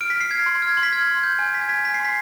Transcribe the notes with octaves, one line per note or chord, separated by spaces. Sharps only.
F6 D7
B6
F6 C7
F6 G#6
C6
F6 G#6
C6
B6
F6 G#6
C6
G6
G#5
G#5 B6
G#6
G#5 B6
G#5 B6
C7
C6 B6